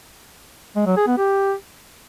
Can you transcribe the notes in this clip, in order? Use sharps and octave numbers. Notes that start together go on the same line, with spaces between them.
G#3
F#3
G#4
B3
G4